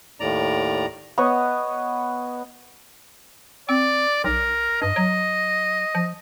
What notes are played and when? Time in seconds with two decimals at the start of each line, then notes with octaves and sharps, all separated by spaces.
0.20 D#2 A2 D5 A#5
1.18 B3 C#5 D#5
3.69 C4 D5
4.24 B1 A#4
4.82 G2 D#5
4.96 F#3
5.95 F3